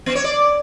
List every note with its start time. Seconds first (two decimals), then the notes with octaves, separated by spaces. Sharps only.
0.06 B3
0.15 C#5
0.24 D5